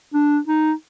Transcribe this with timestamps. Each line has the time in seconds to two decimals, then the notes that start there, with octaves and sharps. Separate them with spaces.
0.14 D4
0.48 D#4